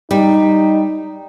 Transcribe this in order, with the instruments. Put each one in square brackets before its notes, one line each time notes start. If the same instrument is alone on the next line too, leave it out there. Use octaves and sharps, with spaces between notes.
[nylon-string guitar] G3 [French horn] D#4